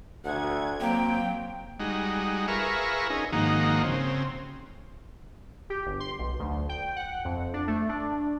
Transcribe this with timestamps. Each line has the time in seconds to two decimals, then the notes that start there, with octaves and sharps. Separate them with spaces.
0.25 D2 F#5 G#6
0.80 F#3 A#3 C4 G5
1.80 G3 G#3 D#4 F#4
2.48 F4 G#4 A#4 B4 E5 C#6
3.10 C#4 D#4 G#4
3.32 G#2 D#3 F3 A#3 D#4 F#4
3.83 C#3 C4
5.70 G4
5.86 G1
6.00 C6
6.19 B1
6.40 D2
6.69 G5
6.96 F#5
7.25 F2
7.54 D4
7.68 A3
7.89 D4